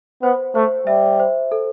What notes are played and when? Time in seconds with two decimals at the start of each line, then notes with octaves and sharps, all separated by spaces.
0.23 B3 C5
0.55 A3 C5
0.87 G3 E5
1.20 C5
1.52 A4